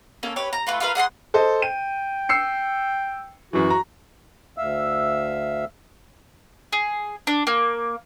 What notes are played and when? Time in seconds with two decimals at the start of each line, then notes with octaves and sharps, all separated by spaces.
0.23 A#3 C#4 A4
0.36 G4 B4 C#5
0.53 A#5
0.67 A3 F4 B4
0.80 F4 A#4 B4 F5
0.95 G#4 F#5 A5 C6
1.34 A4 C5 D#5
1.62 G5 D#7
2.29 E6 C7 C#7
3.53 F#2 E3 F#4
3.70 A#5
4.58 D2 E5 F5 E6
6.73 G#4
7.27 D4
7.47 A#3